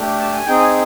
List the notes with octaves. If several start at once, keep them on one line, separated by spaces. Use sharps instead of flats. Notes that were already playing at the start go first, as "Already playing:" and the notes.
Already playing: A3 D4 G4
A5
G#5
C4 D#4 G#4 G5
G#5